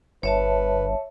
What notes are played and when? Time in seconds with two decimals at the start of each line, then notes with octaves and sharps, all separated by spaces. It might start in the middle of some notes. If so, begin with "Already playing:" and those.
0.23 G1 B4 C#5 E5 A5